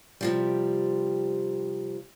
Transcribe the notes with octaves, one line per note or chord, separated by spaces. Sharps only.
C3 F3 G3